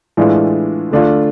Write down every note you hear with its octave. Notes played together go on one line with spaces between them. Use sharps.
A2 E3 G#3 D4 F4
D3 A3 D4 F4